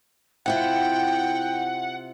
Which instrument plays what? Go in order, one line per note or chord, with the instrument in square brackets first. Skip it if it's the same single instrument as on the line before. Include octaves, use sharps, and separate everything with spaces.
[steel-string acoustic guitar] C3 E4 F4 [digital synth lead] F#5 [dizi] G5